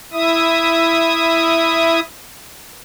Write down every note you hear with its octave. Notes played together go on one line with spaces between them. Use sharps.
E4 E5 D#6